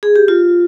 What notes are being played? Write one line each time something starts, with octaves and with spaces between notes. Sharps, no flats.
G#4
G4
F4